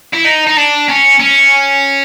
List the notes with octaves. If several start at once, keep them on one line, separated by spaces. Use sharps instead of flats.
E4
D#4
D#4
D4
C#4
C#4